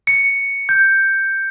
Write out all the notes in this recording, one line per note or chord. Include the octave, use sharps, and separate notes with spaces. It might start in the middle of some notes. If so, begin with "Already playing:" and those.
C#7
G6